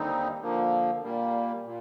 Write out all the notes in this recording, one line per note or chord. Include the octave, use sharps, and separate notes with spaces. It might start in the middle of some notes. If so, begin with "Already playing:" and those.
Already playing: D#2 D3 G3 C4 D#4
D3 F3 A#3
A#2 G3 A#3
A#2